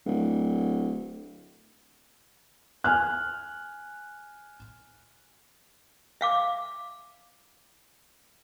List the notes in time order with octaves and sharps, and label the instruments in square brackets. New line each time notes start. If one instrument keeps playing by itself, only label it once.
[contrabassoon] D1
[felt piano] G#5 F6 F#6
[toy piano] E5 F5 D6